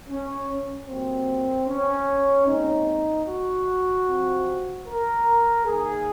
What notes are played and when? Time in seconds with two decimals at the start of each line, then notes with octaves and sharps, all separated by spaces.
0.09 C#4
0.88 C3 F#3 A#3 C4
1.68 C#4
2.47 A#2 G#3 C4 D#4
3.27 F#4
4.06 C3 F3 C4
4.85 A#4
5.65 D#3 A#3 G#4